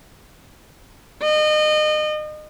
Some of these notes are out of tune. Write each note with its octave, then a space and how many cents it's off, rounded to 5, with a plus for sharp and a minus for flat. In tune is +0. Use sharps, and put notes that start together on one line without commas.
D#5 -30